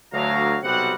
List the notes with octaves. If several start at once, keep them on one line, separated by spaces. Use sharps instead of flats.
D2 F#3 F5 A#5
B1 C3 G3 C4 F#4 F#5